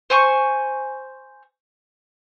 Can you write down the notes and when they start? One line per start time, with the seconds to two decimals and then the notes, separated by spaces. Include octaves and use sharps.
0.10 C5 G#5 C#6